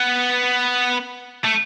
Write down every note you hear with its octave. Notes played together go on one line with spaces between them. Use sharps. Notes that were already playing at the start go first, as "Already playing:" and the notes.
Already playing: B3
A3